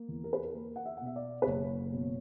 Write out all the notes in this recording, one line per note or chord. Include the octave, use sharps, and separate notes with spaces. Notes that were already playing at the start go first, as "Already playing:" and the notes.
Already playing: A#3
E2
A#4
B4
A#4
A#3 A#4
F#5
E5
B2 F#5
E5
D5
B4
F#1 C#5
B2